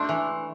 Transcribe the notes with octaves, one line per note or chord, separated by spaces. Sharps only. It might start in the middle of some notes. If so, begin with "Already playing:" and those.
Already playing: A3 D4 C6
E3